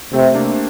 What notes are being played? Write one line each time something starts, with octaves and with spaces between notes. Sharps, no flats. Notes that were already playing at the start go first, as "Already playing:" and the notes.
C3 A3 C4
A#3 D4